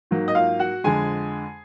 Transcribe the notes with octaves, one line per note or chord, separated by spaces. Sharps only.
G#2 F#3 A#3
D#5
F4 F5
F#4 F#5
F2 D3 F3 G#3 G#4 G#5